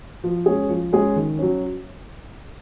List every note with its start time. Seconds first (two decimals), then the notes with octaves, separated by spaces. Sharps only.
0.24 F3
0.46 G#3 C#4 G#4
0.69 F3
0.93 G#3 C#4 G#4
1.16 D#3
1.39 F#3 C#4